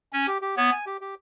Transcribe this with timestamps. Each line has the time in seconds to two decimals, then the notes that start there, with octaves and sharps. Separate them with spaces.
0.13 C#4 G#5
0.27 G4
0.42 G4
0.57 B3 C#5
0.72 G#5
0.86 G4
1.01 G4